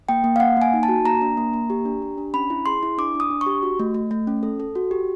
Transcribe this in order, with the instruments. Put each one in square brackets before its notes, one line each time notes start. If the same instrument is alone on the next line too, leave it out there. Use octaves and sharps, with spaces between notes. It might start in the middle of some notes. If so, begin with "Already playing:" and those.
[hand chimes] A#3 G5
A#3
F5
A#3 F#5
A#3 G#5
D#4
A5
F#4
A#3 A#5
D4
A#3
A#3
G4
D4
G4
D4
C#4 B5
E4
G#4 C6
E4
D4 D6
D4
D#6
D4
C#6
G4
F#4
A3
A3
A3
C#4
A4
A4
F#4
G4